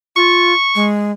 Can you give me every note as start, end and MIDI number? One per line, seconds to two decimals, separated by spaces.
0.16 0.53 65
0.16 0.85 85
0.75 1.11 56